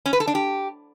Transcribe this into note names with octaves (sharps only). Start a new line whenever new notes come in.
C#4
B4
A4
D4
G4